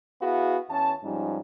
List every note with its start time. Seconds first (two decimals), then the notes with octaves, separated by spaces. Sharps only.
0.21 B3 E4 F#4 G#4 F5
0.70 E2 C#4 A5
1.03 G#2 F3 G3 C#4 D#4